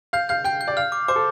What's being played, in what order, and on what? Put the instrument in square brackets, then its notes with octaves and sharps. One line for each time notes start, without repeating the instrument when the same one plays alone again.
[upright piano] F5 [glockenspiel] G6
[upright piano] F5 [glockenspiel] G6
[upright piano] G5 [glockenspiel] G6
[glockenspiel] G6
[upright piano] D5
[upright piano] F5 [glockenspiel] F6
[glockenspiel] D6
[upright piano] C5 [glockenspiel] D6
[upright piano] A4